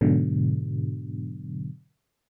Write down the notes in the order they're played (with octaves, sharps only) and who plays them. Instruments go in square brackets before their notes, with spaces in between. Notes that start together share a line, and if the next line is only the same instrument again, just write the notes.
[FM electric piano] G#2 B2 D3 F#3